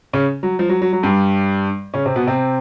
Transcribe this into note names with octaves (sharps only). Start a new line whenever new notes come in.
C#3 C#4
F#3
F3
F#3
F#3
F#3
G2 G3
C#3 C#4
C3 C4
B2 B3
C3 C4